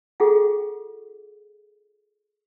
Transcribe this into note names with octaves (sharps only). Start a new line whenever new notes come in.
F4 G#4 A4 F#5